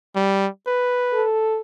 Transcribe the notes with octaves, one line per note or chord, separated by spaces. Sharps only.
G3
B4
A4